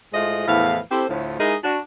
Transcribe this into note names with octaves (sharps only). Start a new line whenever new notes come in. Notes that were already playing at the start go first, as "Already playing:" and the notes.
A2 G#3 A3 F4 C5 D#5
E2 A2 F3 B4 F5
C4 E4 G4 A4 C5
D2 A2 F3
G#3 D#4 E4 G#4 A#4 D#5
D4 F#4